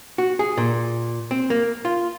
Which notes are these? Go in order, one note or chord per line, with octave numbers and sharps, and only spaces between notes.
F#4
G#4
A#2
C4
A#3
F4